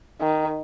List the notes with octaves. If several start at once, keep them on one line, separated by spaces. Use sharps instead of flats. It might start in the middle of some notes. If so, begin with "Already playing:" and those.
D#3